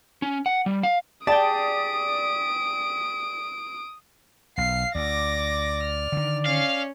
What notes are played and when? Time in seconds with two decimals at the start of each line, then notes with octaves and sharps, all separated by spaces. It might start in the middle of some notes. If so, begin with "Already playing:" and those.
0.22 C#4
0.46 F#5
0.66 G3
0.83 F5
1.27 G4 G#4 D5 G5 A5 D#6 D7
4.58 B1 F5 C7
4.95 D2 D5 D6 A#6
5.83 F6
6.12 D3 D#3
6.46 C#4 F5